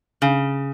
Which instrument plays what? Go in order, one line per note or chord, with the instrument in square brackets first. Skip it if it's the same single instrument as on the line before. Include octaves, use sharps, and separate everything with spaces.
[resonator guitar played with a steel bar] C#3